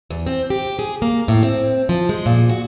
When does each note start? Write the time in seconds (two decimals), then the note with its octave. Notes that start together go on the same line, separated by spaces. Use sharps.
0.10 E2
0.27 C4
0.50 G4
0.79 G#4
1.02 A#3
1.28 A2
1.43 C4
1.89 F3
2.09 G#3
2.26 A#2
2.49 F#4